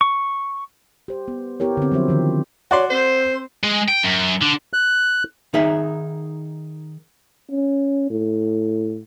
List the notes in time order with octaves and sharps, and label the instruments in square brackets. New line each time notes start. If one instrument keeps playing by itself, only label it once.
[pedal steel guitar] C#6
[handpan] G4 C5
B3
B3 E4 G4 A#4 C#5
D3 C4
F3 F#3 C4 C5 E5
D3 D#3 F3
[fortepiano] F#4 D5 C6 [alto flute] C#5
[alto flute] C4 [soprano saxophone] C5
[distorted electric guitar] G#3
G5
F#2
D3
[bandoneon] F#6
[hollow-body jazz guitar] D#3 D#4 G#4 E5
[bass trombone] C#4
A2